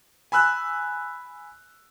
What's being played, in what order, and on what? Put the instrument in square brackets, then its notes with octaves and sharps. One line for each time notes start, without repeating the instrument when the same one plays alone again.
[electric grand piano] G#5 B5 E6 F#6